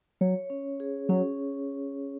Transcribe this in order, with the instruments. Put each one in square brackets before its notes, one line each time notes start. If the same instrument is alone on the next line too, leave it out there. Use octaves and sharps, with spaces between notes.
[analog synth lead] F#3 [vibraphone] C#5
[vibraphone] C#4
G#4
[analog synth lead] F#3 [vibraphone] C#4